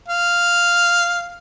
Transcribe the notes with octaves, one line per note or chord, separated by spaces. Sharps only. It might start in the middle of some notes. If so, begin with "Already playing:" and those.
F5